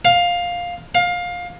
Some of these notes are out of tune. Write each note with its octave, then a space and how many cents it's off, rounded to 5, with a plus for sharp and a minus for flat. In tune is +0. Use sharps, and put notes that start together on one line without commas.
F5 +10
F5 +20